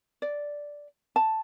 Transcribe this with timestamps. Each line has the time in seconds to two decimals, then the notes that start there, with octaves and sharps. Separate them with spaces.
0.22 D5
1.16 A5